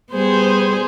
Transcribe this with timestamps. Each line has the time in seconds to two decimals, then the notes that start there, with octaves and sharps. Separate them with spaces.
0.13 G3 B3 G#4 C5